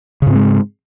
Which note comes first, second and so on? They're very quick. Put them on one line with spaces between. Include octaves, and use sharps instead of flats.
C#3 G#2 C4 G#3